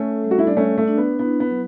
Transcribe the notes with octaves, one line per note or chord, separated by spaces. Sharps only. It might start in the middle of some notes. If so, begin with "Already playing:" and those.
Already playing: A3 C#4 A4
G3
F#4
E4
D4
A3 C#4 D5
A3
D4
B3
B3 E4
B3
F#3